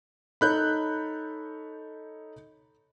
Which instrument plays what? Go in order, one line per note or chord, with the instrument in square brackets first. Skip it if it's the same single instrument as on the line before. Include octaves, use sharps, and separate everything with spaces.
[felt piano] D#4 A4 C#5 [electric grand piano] B5 F#6 G6